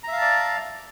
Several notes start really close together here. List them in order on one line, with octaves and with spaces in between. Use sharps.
A#5 E5 F5 A5 D5